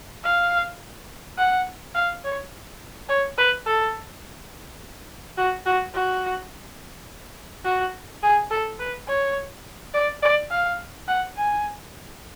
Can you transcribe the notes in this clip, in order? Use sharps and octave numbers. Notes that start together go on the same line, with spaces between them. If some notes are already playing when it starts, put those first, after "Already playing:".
F5
F#5
F5
C#5
C#5
B4
A4
F#4
F#4
F#4
F#4
G#4
A4
B4
C#5
D5
D5
F5
F#5
G#5